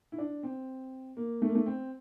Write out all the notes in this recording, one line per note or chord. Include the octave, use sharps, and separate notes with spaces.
E4
D4
C4
A#3
A3
A#3
A3
C4